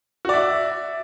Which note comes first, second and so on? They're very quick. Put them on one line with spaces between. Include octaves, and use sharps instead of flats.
F#4 D5 E5